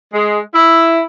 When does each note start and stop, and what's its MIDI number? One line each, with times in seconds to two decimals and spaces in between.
0.13 0.39 56
0.54 1.01 64